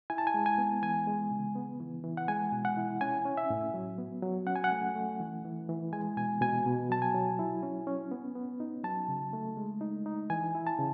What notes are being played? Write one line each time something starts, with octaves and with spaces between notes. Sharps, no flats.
E4 G#5
A5
G#5
G#3
G#5
B3
E3 G#5
G#3
C#3
B3
E3
E3
F#5
G#3 G#5
B2
F#5
E4
C#4 G#5
C#4
E5
A2
F#3
B3
F#3
C#4 F#5
G#5
F#5
A3
A3
E3
E3
E3
G#3 G#5
B2 G#5
B2 G#5
B2
F#3 A5
G#5
F#3
E4
C#4
C#4
B3
B3
D#4
F#3 A5
C#3
A3
G#3
D#4
D#4
E3 G#5
E4
A5
C#3